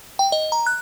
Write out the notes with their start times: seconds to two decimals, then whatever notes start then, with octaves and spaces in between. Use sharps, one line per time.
0.19 G5
0.32 D#5
0.52 A#5
0.66 F#6